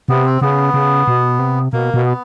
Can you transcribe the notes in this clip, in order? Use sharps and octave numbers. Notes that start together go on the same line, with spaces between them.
C3 B3
C4
C#3 B3
C#3
B2
C3
B2 A#3
B2
B3